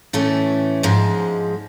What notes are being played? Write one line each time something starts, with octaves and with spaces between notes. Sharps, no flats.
A2 E3 A3 C#4
G#2 F3 G#3